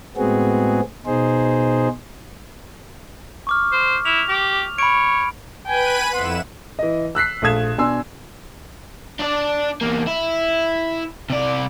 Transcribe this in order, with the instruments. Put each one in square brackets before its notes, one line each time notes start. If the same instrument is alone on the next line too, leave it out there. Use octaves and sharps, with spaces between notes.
[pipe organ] A2 G#3 B3 C4 F#4 G#4
B2 D#4 G#4 C5
[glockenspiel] C#6 D6 F6
[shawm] C5
[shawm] E4 [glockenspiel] F7
[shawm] G4
[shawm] C#5 [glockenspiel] B5 D7
[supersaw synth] B4 B5 D#7 [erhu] G5 [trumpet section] G#5
[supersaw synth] F2 E4 E7 [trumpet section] B3 C6 [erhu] F#5
[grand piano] E3 D#5
E6 F#6 B6 C7
A#1 A3 F5 D#6 G#6 E7
B2 D4 G#5 C6 E6
[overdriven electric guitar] D4 D5
E2 A#3
E4
C3 D5